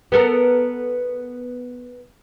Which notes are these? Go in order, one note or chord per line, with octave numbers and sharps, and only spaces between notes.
B3 A4 A#4